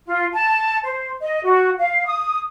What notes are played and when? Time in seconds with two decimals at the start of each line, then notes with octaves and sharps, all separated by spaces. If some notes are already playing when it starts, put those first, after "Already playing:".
0.06 F4
0.33 A5
0.83 C5
1.20 D#5
1.43 F#4
1.78 F5
2.05 D#6